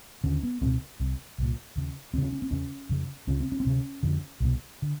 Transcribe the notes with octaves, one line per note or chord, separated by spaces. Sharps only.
D#2 D3 C#4
B3
C#2 B2 C4
C2 C3
C2 A#2
D#2 C#3
D#2 C#3 C4 C#4
C#4
C4
E2 C#3 C#4
F2 C#3
C#2 C#3 C#4
C4
C#4
C4
D2 C3 C#4
F2 D3
C2 B2
D3